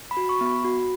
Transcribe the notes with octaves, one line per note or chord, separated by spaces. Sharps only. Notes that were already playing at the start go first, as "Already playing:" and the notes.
B5
F#4
C#6
B3
B5
F#4